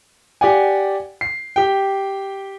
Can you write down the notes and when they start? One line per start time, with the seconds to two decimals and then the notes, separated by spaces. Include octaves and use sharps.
0.41 G4 D5 F#5 G#5
1.21 C7
1.56 G4 G5